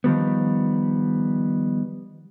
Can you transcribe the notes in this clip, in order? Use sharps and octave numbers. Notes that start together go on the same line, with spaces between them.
D#3 F3 G3 B3